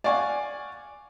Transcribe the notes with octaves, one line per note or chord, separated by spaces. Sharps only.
D5 F5 F#5 G#5 C#6